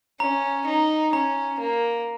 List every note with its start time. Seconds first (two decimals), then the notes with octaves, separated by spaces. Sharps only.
0.20 C#4 A#5
0.67 D#4
1.13 C#4 A#5
1.59 A#3